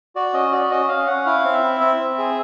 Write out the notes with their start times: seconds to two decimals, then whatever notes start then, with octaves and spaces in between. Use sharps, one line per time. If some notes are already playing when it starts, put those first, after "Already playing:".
0.16 F#4 D5
0.34 C#4 D#5
0.52 F#4 D5
0.70 C#4 D#5
0.89 C#4 F5
1.07 C#4 F#5
1.26 E4 F5
1.44 C4
1.53 E5
1.63 E4
1.81 C4 E5
1.99 C4
2.18 G#4